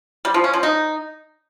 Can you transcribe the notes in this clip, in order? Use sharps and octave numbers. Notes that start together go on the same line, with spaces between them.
G3
F3
C#4
F3
D#4